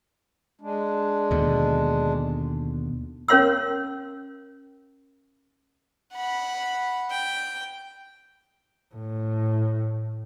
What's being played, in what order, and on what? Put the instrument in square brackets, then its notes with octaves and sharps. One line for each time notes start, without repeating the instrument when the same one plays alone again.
[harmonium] G#3 D4
[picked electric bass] D#2 B2 D3
[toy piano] C#4 A#4 C#5 F5 C6 E6
[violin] F#5 B5
G5
[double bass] A2